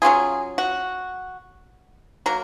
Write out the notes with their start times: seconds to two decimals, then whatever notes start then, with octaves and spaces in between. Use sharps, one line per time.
0.02 F#3 C#4 F4 G#4
0.58 F#4
2.26 F#3 A#3 A#4